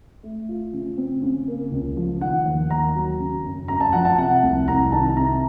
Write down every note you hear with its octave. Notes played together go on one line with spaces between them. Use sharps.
A3
F4
C#3
C4
C#3
A#3
C#2
F3
D#3 F#5
D#2
D#2 A#5
F#3
C#3
F#2
F#2 A#5
A5
F3 F#5
A5
C3 F#5
C2
C2 A#5
D#3 A5
C3 A#5